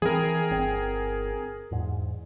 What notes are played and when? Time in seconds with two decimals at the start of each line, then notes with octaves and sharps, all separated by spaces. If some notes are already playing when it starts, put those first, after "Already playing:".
0.02 E3 C4 G#4 A#4
0.51 G1 C4
1.71 E2 G#2